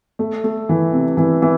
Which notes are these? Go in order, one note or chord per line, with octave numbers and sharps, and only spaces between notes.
A3
A3
E3
C3
E3
E3